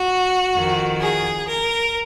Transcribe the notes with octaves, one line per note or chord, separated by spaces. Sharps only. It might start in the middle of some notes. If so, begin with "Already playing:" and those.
Already playing: F#4
F2 D#3
G#4
A#4